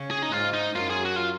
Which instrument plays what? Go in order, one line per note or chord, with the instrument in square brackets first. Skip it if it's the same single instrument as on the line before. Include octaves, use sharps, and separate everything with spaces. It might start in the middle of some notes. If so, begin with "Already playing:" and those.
Already playing: [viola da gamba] C#3 C#4
[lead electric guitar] G#4
D#4
[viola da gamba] G#2 G#3 [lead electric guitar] F4
[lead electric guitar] D#4
[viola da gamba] F#2 F#3 [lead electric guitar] F4
[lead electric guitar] G#4
F#4
F4